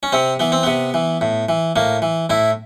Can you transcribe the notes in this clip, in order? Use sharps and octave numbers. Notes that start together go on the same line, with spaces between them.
C#4
C3 C4
E3 B3
C4
C3 B3
E3
A2
E3
A2 A#3
E3
A2 E4